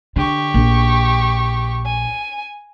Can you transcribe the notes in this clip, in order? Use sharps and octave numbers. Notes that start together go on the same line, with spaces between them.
D3 G4 C#6
A#1
G#5